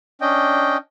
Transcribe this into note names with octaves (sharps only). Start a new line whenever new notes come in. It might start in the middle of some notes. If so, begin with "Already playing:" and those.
C#4 D4 D#5 G5